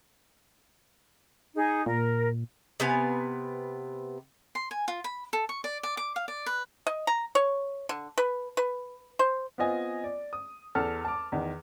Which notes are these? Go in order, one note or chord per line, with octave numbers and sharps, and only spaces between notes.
D#4 G#4
A#2 A#4
C3 B3 G#5
C6
G#5
F4
B5
A4
C#6
D5
D5
D6
F5
D5
B4
D#5
A#5
C#5
D3
B4
B4
C5
B3 C4 F4 D#5 G#5
D5
D#6
E2 A4 F6
A5 D6
E2 D#3